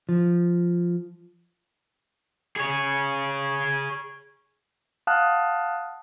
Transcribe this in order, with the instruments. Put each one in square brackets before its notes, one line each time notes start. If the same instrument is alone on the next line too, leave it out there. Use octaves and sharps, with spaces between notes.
[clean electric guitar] F3
[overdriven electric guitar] G#4 C#5
[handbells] F5 F#5 A5 D#6 F6 F#6